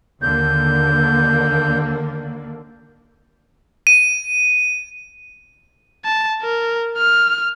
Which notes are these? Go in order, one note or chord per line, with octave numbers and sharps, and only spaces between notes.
D#2 D3 A#3 G6
D#7
A5
A#4
F6